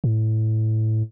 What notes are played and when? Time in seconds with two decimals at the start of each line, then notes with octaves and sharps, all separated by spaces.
0.04 A2